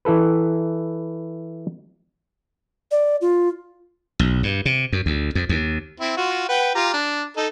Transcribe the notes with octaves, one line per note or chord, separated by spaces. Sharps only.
E3 E4 A4 B4
D5
F4
B1
G2
C3
F#2
D2
F2
D#2
C4 E4
F4 F#4
B4 F#5 G5
F4 G4 A#5
D4
D#4 A4